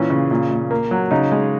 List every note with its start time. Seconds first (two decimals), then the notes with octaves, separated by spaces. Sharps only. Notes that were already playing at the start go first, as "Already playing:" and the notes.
Already playing: A#2 E3 C#4
0.10 C#3
0.31 A#2
0.51 A#2
0.71 A#3
0.91 F#3
1.11 C#3 D#4
1.32 G#3